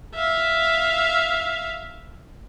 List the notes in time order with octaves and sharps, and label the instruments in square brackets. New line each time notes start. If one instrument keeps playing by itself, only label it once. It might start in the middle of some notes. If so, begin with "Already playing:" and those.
[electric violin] E5 F5